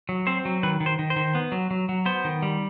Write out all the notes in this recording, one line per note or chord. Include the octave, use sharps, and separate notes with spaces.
F#3
C4 C5
F#3
D#3 B4
D#3
C5
D#3
C5
D#3
B3
F#3
F#3
F#3
B3 C5
D#3
G3